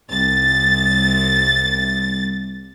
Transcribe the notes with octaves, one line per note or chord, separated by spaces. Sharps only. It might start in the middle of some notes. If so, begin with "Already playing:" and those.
C2 A6